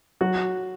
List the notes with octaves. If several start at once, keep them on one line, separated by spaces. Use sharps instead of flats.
F#3 F#4